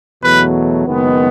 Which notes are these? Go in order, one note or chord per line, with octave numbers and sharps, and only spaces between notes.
E2 B2 F#3 A3 B4
F#1 F#2 D#3 G#3 B3